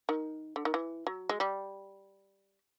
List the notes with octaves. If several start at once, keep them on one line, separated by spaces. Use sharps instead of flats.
D#3
D3
D#3
E3
F#3
G#3
G3